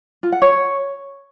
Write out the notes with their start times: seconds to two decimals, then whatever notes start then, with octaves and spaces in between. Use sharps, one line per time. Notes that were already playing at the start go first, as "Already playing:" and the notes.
0.23 F4
0.32 F#5
0.42 C#5